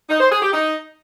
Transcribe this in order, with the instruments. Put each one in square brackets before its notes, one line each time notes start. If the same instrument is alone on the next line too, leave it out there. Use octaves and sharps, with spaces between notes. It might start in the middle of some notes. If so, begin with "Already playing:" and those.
[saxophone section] D#4
C5
G#4
G4
D#4